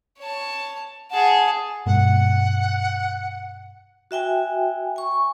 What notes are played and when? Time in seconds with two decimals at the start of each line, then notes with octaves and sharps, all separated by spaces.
0.19 C#5 A5
1.11 G#4 F#5 A5
1.86 G2 B2 A#3 F#5
4.11 F#4 E5 G5 G#5
4.96 G#5 C#6